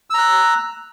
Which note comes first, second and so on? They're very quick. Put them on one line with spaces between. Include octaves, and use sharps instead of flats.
E6 A#5 F#6